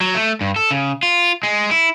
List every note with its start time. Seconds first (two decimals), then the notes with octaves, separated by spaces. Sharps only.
0.01 F#3
0.15 A3
0.41 G2
0.56 A4
0.71 C#3
1.03 F4
1.43 G#3
1.71 E4